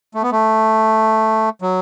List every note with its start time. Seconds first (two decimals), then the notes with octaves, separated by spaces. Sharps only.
0.14 A3
0.22 B3
0.32 A3
1.61 F#3